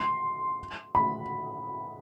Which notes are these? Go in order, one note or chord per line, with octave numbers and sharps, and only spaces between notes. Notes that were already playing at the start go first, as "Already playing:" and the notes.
Already playing: C6
B5